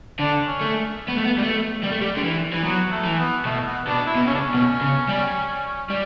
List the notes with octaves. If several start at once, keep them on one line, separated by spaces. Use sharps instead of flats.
D3 D4
C#4
A3
B3
A3
B3
G3
A3
G3
A3
G3
D3
E3
E3
F#3 B3
A3
E3
B3
B2 A3
B3
B2 D4
E4
B2
C#3 C#4
D4
C#4
B2
C#3
G3
G3